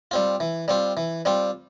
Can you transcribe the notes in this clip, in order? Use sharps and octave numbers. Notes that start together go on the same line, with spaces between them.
G3 C4 F4
E3
G3 C4 F4
E3
G3 C4 F4